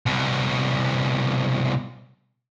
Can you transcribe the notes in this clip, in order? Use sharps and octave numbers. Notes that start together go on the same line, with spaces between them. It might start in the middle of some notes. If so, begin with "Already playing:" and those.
C2 B2